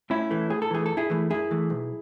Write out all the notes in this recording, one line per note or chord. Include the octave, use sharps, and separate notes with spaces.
A2 C#4 E4
E3 A3
A2 G#4
A4
E3 A3 G#4
F#2 A4
E4 G#4
E3 A3
F#2 E4 G#4
E3 A3
B1